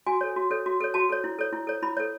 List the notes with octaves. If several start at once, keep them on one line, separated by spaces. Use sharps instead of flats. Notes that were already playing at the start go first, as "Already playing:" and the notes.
F#4 G#5
A4 C#5
F#4
A4 C#5
F#4
A4 C#5
F#4 A5
A4 C#5
E4
A4 C#5
E4
A4 C#5
E4 B5
A4 C#5